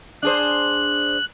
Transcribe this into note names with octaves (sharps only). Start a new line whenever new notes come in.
D4 G#4 C5 F#6